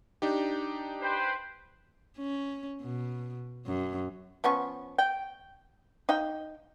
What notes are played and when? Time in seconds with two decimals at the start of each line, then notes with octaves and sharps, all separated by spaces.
0.22 D4 D#4 G4
1.02 B4 C5 G5
2.18 C#4
2.81 B2
3.66 F#2
4.44 F3 B3 C#4 C#6
4.98 G5
6.09 D#4 F5 G5